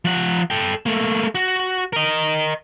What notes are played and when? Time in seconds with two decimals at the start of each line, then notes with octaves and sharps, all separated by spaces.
0.05 F3 F#5
0.50 A4 G5
0.86 A3 A#3
1.35 F#4
1.93 A#4 D#5